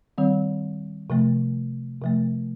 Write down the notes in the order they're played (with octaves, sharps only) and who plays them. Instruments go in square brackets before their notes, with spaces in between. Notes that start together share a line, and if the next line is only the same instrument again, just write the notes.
[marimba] D#3 G3 C4
C3 F3 A3
C3 F3 A3